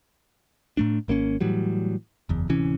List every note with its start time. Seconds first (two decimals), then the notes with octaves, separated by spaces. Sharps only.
0.77 A2 A3 D4
1.08 G#1 A#3 C4 C#4
1.41 A2 E3 F#3 G3
2.29 F#1 E2
2.49 D1 C3 E3 C#4